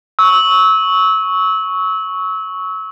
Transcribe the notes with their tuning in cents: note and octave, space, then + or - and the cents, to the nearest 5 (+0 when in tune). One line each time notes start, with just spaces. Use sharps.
C#6 +5 E6 -25